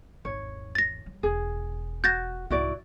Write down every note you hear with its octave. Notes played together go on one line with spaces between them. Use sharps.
G#1 E2 C#5
A6 A#6
G3
E1 G#4
F#4 G6 A6 A#6
C2 G#2 E4 F#4 D5